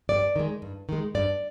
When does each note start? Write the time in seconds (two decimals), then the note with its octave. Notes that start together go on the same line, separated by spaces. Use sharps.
0.09 G2 D5
0.36 D#3 G#3
0.62 G2
0.89 D#3 G#3
1.15 G2 D5